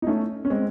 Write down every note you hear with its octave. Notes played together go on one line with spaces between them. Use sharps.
D#4
A3 C#4
C#4
G#3 C4